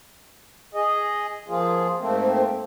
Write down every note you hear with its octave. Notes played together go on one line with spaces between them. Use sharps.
G#4 D#5
F3 A#3 F4 G#4
G#2 A3 A#3 C4